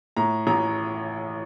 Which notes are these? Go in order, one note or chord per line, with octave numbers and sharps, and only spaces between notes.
A2 A#5
A1 A#5